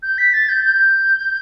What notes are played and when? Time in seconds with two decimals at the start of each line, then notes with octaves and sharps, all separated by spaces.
0.03 G6
0.18 B6
0.34 A6
0.49 G6
0.64 G6